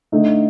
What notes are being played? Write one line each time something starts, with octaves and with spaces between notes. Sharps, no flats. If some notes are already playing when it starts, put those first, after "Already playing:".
D3 A3 D#4